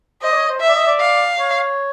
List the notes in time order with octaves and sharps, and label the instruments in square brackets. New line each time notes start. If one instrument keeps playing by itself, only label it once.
[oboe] C5 [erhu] D#5
[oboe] D5
C#5
C5
[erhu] E5
[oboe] D5
D#5
D5
[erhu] F5
[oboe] C#5